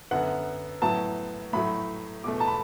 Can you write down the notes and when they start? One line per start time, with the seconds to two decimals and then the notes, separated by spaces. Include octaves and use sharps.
0.11 F#2 D3 B3 F#5
0.82 A2 F#3 B3 A5
1.53 A2 F#3 A3 B5
2.24 E2 B2 A3 D6
2.40 A5
2.47 B5